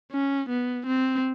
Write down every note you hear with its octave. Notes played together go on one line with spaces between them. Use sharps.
C#4
B3
C4